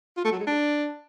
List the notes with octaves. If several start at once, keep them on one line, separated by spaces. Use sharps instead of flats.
F4
A3
F#3
G#3
D4